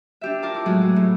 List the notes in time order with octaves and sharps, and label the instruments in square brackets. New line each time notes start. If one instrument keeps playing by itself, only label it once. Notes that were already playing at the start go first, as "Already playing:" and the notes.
[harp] D4 G4 E5
F4 A#4 A5 D6
E4 D6
A2 F#3 G#3 G#4
F#4
A2